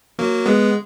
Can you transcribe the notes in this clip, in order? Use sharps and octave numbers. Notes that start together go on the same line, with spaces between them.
F#3 A#3
G#3 B3